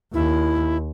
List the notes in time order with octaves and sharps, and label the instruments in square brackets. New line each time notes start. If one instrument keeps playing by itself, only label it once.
[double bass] D#2 [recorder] E4